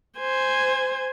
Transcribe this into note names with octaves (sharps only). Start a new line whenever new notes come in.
C5 G#5